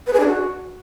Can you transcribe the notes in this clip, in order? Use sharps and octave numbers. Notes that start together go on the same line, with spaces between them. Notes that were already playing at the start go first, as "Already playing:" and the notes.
B4
G#4
D4
F#4